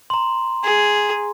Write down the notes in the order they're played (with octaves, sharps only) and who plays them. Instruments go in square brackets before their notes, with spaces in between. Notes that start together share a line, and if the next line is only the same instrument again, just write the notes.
[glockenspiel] A#5 C6
[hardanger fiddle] G#4